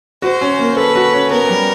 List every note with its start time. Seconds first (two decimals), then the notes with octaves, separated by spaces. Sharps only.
0.22 F#4 C5
0.41 C#4
0.59 A#3
0.76 A4 B4
0.95 F#4
1.13 C#4
1.31 B3 A#4
1.49 G3